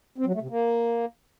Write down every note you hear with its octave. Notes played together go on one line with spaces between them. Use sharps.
C4
F#3
A3
C3
A#3